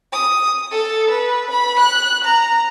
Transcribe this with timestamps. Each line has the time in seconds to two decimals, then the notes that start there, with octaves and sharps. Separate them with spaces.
0.13 D#6
0.71 A4
1.10 B4
1.51 B5
1.79 F#6
2.24 A#5